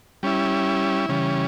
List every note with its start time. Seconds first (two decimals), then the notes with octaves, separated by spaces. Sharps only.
0.23 G3 C#4 E4
1.09 C#3 E3 G3 C#4